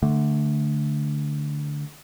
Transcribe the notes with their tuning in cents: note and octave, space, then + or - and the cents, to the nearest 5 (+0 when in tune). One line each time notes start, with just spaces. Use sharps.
D3 +0 A3 +0